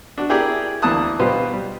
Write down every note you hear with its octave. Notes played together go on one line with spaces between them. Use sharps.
D4 F#4
E4 G4 G#4 A#4 D5
D2 E3 A#3 A5 D#6 F#6
B2 G3 F4 G4 B4 C5
G3